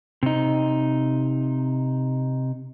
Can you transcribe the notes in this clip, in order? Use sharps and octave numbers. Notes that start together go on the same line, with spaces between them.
C3 D#4